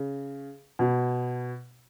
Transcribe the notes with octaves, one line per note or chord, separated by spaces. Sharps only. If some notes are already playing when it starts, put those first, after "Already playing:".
Already playing: C#3
B2